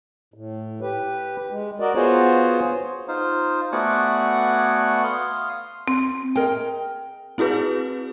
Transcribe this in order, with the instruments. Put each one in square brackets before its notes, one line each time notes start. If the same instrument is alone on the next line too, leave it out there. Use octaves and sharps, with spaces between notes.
[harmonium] A2
G4 B4
G#3
F#4 A#4 D5 D#5
B3 F4 F#4 G#4 C5 C#5
[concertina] D#4 F4 C5
A3 B3 F#4 D5 F#5 G#5
F5 C6 D#6
[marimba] C4
[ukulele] G#4 A#4 D#5 [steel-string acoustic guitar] G5
[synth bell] C4 E4 F#4 G#4 B4